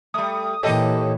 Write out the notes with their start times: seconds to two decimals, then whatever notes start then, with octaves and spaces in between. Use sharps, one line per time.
0.14 G3 A3 D#6
0.63 A#2 E3 G4 A4 C#5 D#5